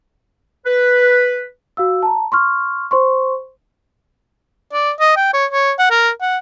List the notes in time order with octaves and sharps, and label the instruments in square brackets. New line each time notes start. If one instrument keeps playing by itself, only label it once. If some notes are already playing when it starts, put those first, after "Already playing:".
[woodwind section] B4
[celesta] F#4 F5 E6
A5 A#5
C6 C#6 F6
C5 C6 C#6
[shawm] D5
D#5
G5
C#5
C#5
F#5
A#4
F#5